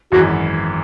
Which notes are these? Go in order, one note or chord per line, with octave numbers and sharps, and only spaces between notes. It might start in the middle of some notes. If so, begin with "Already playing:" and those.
G#1 F#2 E3 G#3 F#4